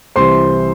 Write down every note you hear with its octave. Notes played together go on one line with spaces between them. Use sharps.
C2 C3 E3 C5 C6